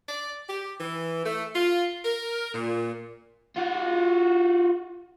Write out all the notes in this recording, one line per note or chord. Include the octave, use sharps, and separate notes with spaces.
D5
G4
E3
A3
F4
A#4
A#2
F4 F#4